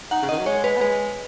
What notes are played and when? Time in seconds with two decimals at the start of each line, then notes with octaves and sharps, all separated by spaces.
0.11 D#4 F#5
0.22 C#3
0.29 D#3 D#5
0.39 F#3
0.46 G#3 C#5
0.64 G#3 B4
0.77 B3
0.81 G#3 B4